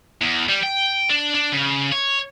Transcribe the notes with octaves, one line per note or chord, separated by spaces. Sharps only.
E2
G3
G5
D4
D4
C#3
C#5